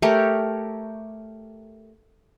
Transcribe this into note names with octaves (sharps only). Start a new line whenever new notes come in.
A3 G4 A#4 C#5